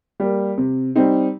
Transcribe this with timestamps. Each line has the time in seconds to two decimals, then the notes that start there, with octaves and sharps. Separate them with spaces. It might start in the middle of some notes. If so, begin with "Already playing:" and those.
0.20 G3 A#3
0.58 C3
0.95 G3 C4 D#4